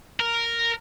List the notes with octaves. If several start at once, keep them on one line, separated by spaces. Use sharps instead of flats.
A#4